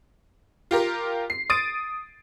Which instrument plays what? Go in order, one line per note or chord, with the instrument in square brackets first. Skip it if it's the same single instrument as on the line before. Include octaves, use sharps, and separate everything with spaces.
[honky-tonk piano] F4 G4 A#4
C7
D#6 A6 D7 D#7